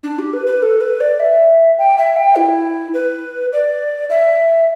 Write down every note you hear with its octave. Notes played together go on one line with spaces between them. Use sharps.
D4
G4
B4
B4
A4
B4
D5
E5
G5
E5
G5
E4
B4
D5
E5